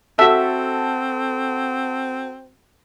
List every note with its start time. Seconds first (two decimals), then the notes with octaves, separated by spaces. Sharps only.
0.19 C4 F#4 A4 E5